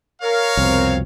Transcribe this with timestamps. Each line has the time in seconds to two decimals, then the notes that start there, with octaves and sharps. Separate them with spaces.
0.22 A#4 C#5 F5
0.57 C2 F2 B2 C4